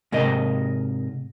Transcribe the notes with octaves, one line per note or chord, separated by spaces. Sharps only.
G#2 C3 A#4 D#5